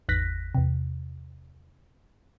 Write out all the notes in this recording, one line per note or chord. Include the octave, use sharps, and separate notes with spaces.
G#1 E2 F#6 A#6 B6
E2 C3